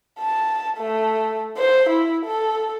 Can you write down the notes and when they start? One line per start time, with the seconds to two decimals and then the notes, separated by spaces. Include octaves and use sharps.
0.20 A5
0.78 A3
1.58 C5
1.89 E4
2.25 A4